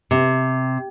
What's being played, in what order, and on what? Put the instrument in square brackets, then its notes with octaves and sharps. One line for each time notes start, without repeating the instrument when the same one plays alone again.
[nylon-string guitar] C3